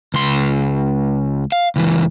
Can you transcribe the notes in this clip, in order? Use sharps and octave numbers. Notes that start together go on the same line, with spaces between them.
C#2 C6
F5
C#2 E3